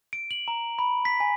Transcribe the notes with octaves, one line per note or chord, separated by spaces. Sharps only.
D7
F#7
A#5
B5
B6
G#5